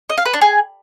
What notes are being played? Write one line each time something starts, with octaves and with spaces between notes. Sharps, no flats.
D#5
F5
B4
D4
G#4